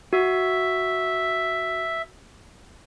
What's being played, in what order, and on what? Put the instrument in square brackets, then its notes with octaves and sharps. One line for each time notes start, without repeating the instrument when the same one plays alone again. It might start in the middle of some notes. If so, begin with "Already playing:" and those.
[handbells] F#4 [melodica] E5